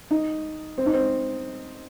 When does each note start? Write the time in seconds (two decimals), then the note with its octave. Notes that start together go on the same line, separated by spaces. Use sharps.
0.11 D#4
0.78 C4
0.86 D#4
0.94 C4